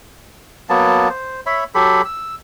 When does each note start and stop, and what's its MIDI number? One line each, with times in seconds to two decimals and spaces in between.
0.69 1.09 54
0.69 1.09 58
0.69 1.09 59
0.69 1.09 81
1.10 1.41 72
1.46 1.64 73
1.46 1.64 76
1.46 1.64 83
1.75 2.02 54
1.75 2.02 67
1.75 2.02 69
1.75 2.02 83
2.05 2.35 88